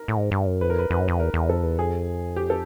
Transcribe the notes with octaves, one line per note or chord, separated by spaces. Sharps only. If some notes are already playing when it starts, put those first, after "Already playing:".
Already playing: A#4
A2
G#2
G2
F#2
F2 B4
A#4
B4
F2 B4
F#2
F2
E2 A#4
E2
F2 A4
E2
F2 G#4
G4
A4